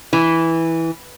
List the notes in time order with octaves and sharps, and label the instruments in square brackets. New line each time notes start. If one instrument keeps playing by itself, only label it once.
[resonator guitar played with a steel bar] E3